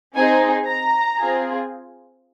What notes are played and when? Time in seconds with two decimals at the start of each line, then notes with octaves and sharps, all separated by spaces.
0.15 C4 D#4 G#4 G#5
0.67 A#5
1.18 C4 F4 G#4